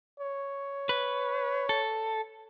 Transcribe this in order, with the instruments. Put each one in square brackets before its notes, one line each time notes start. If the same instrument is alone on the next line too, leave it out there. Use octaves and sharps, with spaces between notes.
[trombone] C#5
[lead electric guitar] B4
A4